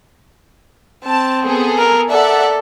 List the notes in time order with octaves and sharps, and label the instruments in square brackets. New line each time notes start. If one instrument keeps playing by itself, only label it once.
[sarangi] C4 [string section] A5
[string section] B3 G#4 A4
[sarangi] A#4
[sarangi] A4 [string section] D5 E5 F#5